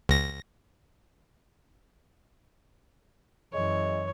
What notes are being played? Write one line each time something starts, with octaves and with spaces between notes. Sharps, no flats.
C#2 A#6
F#2 E3 G#3 C#5